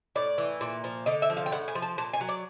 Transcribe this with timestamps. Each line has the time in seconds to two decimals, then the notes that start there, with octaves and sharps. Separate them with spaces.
0.16 A2 D5
0.38 E3
0.61 A#2
0.84 F3
1.06 D3 D#5
1.22 E5
1.30 F3
1.37 F5
1.46 G5
1.52 A2 F#5
1.68 G#5
1.75 F3
1.82 A5
1.98 A#2 A5
2.13 G#5
2.21 F#3
2.29 D5